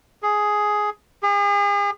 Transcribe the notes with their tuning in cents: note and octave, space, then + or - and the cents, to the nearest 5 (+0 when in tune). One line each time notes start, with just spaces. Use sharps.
G#4 +5
G#4 -40